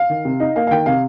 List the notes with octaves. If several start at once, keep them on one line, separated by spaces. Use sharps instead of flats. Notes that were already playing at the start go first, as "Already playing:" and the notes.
Already playing: F5
D#3
C3
D#4
A#3 F5
F5
D#3 G5
C3 F5